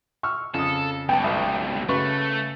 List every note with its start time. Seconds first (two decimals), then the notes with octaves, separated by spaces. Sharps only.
0.23 C#6 E6 F6
0.54 F2 C#3 A4 D#6
1.09 C#2 B2 G5 A5
1.24 B1
1.89 C#3 A3 F#4 B4 C#6